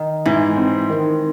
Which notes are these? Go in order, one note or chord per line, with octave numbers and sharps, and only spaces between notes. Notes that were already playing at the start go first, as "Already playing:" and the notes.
Already playing: D#3
G#2 E3
C4
D#3